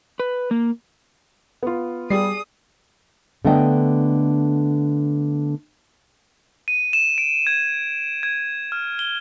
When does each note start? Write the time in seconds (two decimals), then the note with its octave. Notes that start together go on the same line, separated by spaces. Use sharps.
0.20 B4
0.51 A#3
1.63 B3 F4
2.10 G3 G#4 D5 D#6 C7
3.45 D3 A3 B3 D4 D#5 G5
6.68 D#7
6.93 E7
7.18 D7
7.47 G#6
8.23 G#6
8.72 F6
8.99 G7